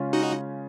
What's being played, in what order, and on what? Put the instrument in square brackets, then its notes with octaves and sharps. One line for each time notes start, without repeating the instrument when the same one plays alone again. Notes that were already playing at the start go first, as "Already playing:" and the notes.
Already playing: [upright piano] C#3 G#3 C#4 F4
[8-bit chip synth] D#4 F#4